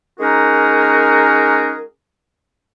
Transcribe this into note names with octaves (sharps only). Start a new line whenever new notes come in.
G#3 C#4 D#4 F#4 G#4 A#4